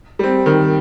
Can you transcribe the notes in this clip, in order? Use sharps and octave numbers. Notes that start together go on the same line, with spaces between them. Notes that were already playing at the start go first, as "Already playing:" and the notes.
G3 C4
D#3